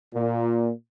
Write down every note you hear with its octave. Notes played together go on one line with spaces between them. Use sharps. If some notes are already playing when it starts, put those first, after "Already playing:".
A#2